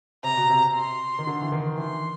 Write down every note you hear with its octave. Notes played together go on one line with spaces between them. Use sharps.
C3 A#5
B2
C3
C6
D#3
D3
E3
D#3
E3 C6